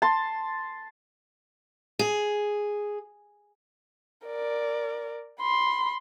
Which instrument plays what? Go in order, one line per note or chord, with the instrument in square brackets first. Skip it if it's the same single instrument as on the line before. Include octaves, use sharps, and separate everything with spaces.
[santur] A5 C6
[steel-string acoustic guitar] G#4
[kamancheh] A#4 D5
B5 C6